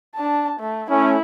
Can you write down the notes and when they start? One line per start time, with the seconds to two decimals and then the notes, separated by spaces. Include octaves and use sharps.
0.15 D4 A5
0.60 A3
0.91 A3 C#4 E4